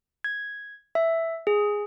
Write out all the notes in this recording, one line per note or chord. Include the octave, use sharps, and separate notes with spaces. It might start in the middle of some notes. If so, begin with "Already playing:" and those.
G#6
E5
G#4